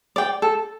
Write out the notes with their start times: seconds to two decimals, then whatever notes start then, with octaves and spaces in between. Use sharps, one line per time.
0.16 D5 G5
0.42 A4